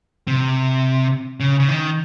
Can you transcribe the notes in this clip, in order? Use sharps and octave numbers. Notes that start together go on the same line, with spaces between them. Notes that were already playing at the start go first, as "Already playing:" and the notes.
C3
C#3
C#3
D#3